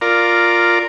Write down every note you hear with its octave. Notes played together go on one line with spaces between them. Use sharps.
F4 A#4 D5